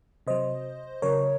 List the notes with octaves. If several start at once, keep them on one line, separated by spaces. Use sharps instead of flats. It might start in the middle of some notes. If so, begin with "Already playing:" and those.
C3 F#3 C5 D#5
C#3 F#3 A#4 C#5